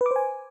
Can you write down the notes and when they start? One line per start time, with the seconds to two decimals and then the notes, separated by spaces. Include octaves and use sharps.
0.01 B4
0.06 D6
0.11 C5
0.16 G#5